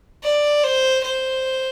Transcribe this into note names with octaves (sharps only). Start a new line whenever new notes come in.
D5
C5
C5